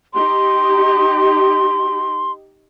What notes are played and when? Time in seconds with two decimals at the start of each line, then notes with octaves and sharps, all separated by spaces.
0.14 D#4 G4 C6